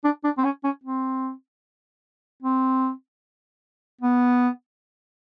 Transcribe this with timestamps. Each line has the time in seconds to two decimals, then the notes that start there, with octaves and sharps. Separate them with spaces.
0.04 D4
0.24 D4
0.38 C4
0.44 C#4
0.64 C#4
0.84 C4
2.43 C4
4.01 B3